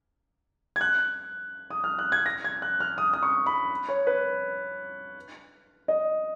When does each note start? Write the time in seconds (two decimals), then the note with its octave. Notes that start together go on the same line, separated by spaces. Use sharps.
0.76 G#6
0.81 F#6
1.70 D#6
1.84 F6
1.99 F#6
2.12 G#6
2.26 A#6
2.44 G#6
2.62 F#6
2.80 F6
2.98 D#6
3.13 D#6
3.23 C#6
3.46 B5
3.88 C#5
4.07 B4
5.88 D#5